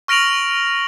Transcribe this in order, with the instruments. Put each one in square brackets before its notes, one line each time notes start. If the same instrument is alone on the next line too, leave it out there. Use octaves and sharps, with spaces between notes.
[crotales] C#6 F6 A#6 D7 F7 F#7